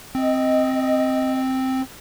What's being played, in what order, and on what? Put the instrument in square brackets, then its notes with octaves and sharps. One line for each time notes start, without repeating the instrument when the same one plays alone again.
[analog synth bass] C4 [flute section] D#5